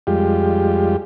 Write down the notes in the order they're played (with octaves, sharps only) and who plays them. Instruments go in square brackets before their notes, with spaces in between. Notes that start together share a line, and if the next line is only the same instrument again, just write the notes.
[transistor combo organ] F2 G3 G#3 F4 G4